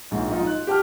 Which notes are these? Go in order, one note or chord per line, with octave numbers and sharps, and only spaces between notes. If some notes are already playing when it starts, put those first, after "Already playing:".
A#1 G#2
D#4 F4
F#6
G4 A5 F6